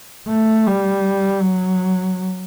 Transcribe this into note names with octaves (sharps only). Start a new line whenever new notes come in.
A3
G3
F#3